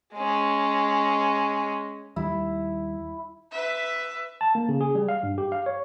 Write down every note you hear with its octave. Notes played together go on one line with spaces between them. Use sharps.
G#3 C#4
D#2 G3 E4
B4 E5
A5
A#3
C#3
G#4
G3
F5
G2
G4
F5
C#5